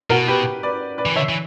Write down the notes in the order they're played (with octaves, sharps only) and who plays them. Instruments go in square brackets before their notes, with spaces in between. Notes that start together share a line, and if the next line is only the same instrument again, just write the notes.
[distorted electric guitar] B2 [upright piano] F#4 A#4
[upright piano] G4 B4
B4 D5
B4 D5
[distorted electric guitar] E3
[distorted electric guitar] D3 [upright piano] C#5 E5
[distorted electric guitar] E3